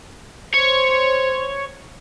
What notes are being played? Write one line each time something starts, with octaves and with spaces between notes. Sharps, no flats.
C5 C#5